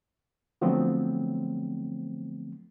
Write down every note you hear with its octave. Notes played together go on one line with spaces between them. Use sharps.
D3 F3 F#3 A3 B3 C4